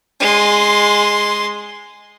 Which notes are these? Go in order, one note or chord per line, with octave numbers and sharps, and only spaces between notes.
G#3 C6